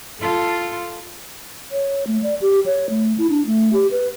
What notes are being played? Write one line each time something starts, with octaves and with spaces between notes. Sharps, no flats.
F4 A4
C#5
A3
D5
G4
C#5
A3
E4
D4
A3
G4
B4